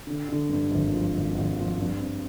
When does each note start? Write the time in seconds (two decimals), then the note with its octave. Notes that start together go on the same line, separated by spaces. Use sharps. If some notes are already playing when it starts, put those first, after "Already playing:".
0.07 D3
0.29 D3
0.49 G2
0.71 G#1
0.92 F3
1.14 G#1
1.35 G#1
1.56 F3
1.77 G2
1.99 C4